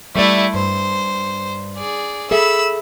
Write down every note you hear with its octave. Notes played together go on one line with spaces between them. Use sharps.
G3 A3 E4 D5
G2 C5
G#4 D5
G#4 A4 E5 B5 E6